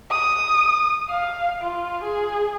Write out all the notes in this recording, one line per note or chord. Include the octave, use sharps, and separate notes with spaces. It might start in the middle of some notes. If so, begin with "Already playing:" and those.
D#6
F5
F4
G#4